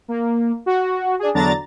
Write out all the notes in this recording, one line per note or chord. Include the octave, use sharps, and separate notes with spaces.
A#3
F#4
D4 G#4
E2 D3 F#3 D4 A#5 A6